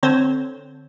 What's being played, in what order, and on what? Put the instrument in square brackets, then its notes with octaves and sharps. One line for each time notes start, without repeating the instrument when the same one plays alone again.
[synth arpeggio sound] D3 C4 C5 C#5